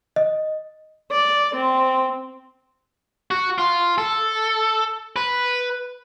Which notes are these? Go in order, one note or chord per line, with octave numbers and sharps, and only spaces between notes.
D#5
D5
C4
F#4
F4
A4
B4